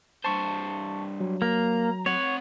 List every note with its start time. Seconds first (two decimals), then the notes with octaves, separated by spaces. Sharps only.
0.25 G2 C5 A5 C#6
1.20 F#3
1.42 A#3 A#5
2.06 C4 C#5 F#5